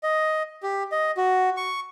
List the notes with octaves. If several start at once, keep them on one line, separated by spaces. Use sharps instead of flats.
D#5
G4
D#5
F#4
C#6